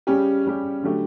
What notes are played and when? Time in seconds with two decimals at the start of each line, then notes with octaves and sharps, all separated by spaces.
0.07 C#3 G3 C#4 G4
0.45 C#3 G3 C#4 G4
0.84 D3 F#3 A3 D4 G4